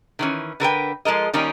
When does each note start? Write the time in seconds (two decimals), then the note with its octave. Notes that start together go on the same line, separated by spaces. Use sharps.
0.19 D#3 E3 C#4
0.60 D3 A#4 B4 G5
1.05 F3 G#3 A4 A#4 D#5
1.34 D#3 G3 A#3 C#4 D#4